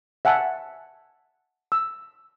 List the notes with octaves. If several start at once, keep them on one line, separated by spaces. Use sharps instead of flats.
E5 F#5 G#5 A5
E6